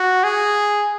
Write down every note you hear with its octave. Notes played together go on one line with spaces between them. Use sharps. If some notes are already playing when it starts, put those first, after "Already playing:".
Already playing: F#4
G#4